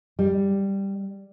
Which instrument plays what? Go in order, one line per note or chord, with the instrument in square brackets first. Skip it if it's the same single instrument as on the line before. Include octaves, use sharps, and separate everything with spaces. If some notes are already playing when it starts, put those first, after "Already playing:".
[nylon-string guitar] G3